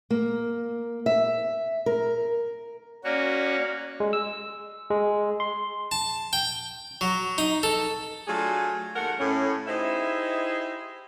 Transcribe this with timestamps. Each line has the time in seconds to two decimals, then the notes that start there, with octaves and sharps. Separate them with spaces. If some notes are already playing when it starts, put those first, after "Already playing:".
0.10 A#3
1.06 E5
1.86 A#4
3.04 A#3 C#4 F#4 D5
4.00 G#3
4.13 E6
4.90 G#3
5.40 C6
5.92 A5
6.33 G5
7.01 F#3
7.38 D#4
7.63 A4
8.28 F#3 A3 D4 F4 G#4
8.96 D#2 A3 A#4 F#5
9.19 A2 C#4
9.68 D#4 E4 G4 G#4 C5 E5